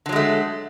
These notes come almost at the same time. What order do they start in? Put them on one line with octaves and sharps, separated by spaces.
D3 F#3 G#3 A3